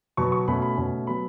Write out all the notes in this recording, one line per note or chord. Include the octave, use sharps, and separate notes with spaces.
B2 F#3 B3 C#6
C#6
B2 A3 C#4 B5
B5
B2 A3 C#4
F#3 B3 B5